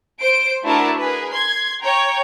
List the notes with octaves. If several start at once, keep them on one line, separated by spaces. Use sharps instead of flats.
C5 D7
A3 D4 E4 F#4 A#4 A5
G#4 A#4 B4
C6 G#6
C#5 G5 A#5